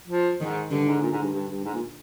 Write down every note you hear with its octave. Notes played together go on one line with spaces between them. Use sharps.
F3
G#2 D#3
G2 D3
G#2
A#2
G#2
G2
G2
G2
G#2
A#2